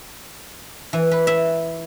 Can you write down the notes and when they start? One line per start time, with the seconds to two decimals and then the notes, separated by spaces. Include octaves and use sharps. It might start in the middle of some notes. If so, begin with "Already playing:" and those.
0.93 E3
1.11 B4
1.27 E5